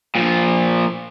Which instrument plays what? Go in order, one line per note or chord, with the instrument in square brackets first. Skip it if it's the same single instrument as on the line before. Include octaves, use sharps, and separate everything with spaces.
[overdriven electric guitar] A#2 F3